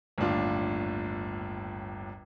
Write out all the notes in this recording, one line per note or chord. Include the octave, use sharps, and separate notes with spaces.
G1 D#2 A2 D4 F4